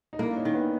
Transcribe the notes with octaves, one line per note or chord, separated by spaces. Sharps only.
D#4
A#3 D4 E4
C#4 D#4
D#3
B3 C#4